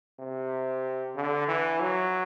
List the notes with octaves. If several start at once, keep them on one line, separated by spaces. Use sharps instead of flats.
C3
D3
E3
F#3